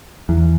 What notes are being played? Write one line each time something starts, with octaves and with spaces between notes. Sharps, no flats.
E2